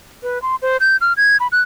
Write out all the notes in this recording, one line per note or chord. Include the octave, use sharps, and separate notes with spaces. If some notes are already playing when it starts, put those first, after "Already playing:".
B4
C6
C5
G6
F6
G#6
B5
F#6